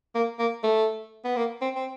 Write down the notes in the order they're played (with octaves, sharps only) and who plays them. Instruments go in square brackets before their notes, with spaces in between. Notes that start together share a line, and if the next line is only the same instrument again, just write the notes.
[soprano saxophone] A#3
A#3
A3
B3
A#3
C4
C4